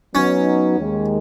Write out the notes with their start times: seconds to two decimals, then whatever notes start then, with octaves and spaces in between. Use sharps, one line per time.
0.15 F#3 B3 C#4 D#4
0.79 D#2 D#3 G#3